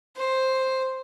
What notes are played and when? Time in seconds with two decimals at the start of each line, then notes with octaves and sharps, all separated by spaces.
0.16 C5